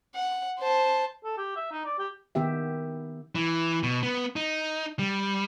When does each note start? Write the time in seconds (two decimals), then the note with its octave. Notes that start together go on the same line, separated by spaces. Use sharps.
0.15 F#5
0.60 C5 A5
1.24 A4
1.37 G4
1.56 E5
1.72 D#4
1.85 D5
1.99 G4
2.35 D#3 B3 G4 E5
3.35 E3
3.83 B2
4.03 B3
4.36 D#4
4.99 G3